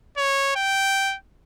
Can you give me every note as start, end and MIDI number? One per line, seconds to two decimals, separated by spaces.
0.17 0.53 73
0.55 1.16 79